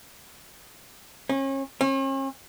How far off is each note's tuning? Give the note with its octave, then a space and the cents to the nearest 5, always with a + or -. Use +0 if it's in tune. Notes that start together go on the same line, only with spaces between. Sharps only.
C#4 -35
C#4 -45